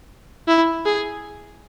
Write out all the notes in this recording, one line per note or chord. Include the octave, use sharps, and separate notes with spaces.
E4
G#4